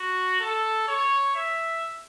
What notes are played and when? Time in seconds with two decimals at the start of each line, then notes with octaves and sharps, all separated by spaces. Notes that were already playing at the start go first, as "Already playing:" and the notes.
Already playing: F#4
0.40 A4
0.88 C#5
1.36 E5